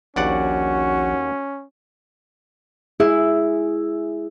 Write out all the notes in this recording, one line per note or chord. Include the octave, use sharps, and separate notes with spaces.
A#1 D#2 C#4 F#4 D5 F#5
E4 G#4